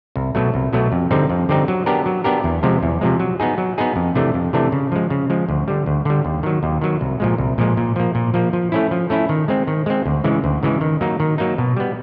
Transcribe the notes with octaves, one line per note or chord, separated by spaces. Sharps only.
C2
B2 F#3 A3
C2
B2 F#3 A3
F2
D3 G3 C4 D#4
F2
D3 G3 C4 D#4
F#3
B3 D4 G4 A#4
F#3
B3 D4 G4 A#4
E2
C3 F3 G#3
E2
C3 F3 G#3
F#3
B3 D#4 G#4
F#3
B3 D#4 G#4
F2
C3 E3 A3 D4
F2
C3 E3 A3 D4
C#3
F3 G#3
C#3
F3 G#3
D2
D3 G3
D2
D3 G3
D#2
D#3 F#3
D#2
D#3 F#3
C2
A#2 F3 G#3
C2
A#2 F3 G#3
A#2
F3 A#3
A#2
F3 A#3
F3
A3 C#4 E4
F3
A3 C#4 E4
D#3
G#3 C4
D#3
G#3 C4
D2
C#3 E3 G#3
D2
C#3 E3 G#3
D#3
F#3 A#3 D#4
D#3
F#3 A#3 D#4
B2
G3 B3